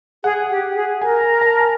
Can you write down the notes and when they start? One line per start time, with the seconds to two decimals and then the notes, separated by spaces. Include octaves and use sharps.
0.24 G#4 F#5
0.50 G4
0.71 G4
0.75 G#4
1.02 A#4 G#5
1.21 A#5
1.41 A5
1.60 G#5